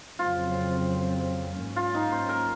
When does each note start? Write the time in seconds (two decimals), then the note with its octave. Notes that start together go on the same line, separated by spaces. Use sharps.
0.19 F2 C#3 F#3 C4 F4
1.59 G#2 F#3 A#3 C#4
1.76 F4
1.95 D#4
2.12 C5
2.29 A#4